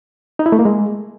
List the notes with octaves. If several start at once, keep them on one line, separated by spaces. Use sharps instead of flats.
D#4
E4
A3
A#3
G#3